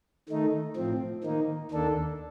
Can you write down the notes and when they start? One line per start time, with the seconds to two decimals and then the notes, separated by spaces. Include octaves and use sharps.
0.29 D#3 A3 D#4
0.76 A2 F3 C4
1.24 D#3 A#3 D#4
1.71 D#2 D#3 A#3 D4 A4